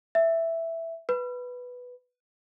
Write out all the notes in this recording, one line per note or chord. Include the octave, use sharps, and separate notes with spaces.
E5
B4